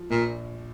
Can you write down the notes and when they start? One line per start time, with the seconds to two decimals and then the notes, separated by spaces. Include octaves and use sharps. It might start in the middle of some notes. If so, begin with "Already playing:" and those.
Already playing: F3
0.10 A#1 A#2